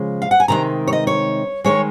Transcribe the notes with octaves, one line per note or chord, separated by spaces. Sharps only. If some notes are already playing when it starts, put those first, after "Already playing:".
Already playing: C#3 F3 G#3
F5
F#5
G#5
C3 D#3 G#3 A#5
C#5
D#5
C#5
D#3 G#3 C#5